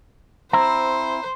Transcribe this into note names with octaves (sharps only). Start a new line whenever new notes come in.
C4 E4 C5 A#5